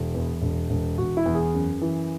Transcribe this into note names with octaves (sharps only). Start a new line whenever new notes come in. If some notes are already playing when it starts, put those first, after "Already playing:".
Already playing: E1
E2
E1
E1
E1 F#4
E4
E2
G#4
F#2
E3